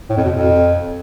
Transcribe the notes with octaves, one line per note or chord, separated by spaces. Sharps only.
A2
F2
B2
F2